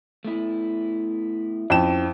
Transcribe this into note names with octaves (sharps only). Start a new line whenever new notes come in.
A3 B3 E4
F2 C#4 E4 G5 E7